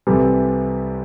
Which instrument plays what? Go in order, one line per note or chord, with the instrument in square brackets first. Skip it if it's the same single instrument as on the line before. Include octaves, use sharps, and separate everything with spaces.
[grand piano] C2 C3 E3 G3 A4